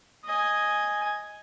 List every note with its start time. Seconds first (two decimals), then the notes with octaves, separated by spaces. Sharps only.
0.25 D#5 G#5